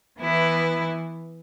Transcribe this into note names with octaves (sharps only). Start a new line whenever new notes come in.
E3 B3 E4 B4